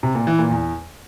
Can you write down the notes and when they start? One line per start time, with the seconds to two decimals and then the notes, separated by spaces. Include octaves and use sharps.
0.03 C3
0.15 A#2
0.27 E3
0.39 A#2
0.51 E2